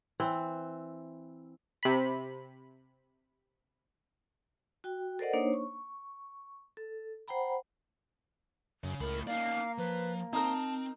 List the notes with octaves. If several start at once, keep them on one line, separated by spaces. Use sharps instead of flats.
E3 C4
C3 B5
F#4 G5
A4 A#4 C5 D5 D#5 F#5
A#3 D4 D#4 C5 C#5
C#6
A4
C5 F#5 G5 A#5 B5
F#2 C#3
C#2 A2 A#4 B5
A#3 D#4 D5 F5
F3 B4
C4 D#4 A#4 A5